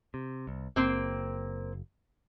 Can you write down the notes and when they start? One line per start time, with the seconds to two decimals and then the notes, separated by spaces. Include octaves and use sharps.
0.14 C3
0.47 C2
0.76 F#1 A#3 C4